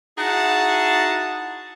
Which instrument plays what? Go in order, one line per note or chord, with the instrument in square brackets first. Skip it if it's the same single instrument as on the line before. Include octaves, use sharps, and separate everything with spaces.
[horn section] D#4 E4 F#4 G#4 F#5 A5